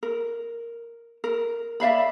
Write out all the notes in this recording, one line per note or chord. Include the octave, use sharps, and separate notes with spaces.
A#4
A#4
D5 E5 F5 B5